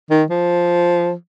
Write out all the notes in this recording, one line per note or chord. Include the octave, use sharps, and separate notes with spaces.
D#3
F3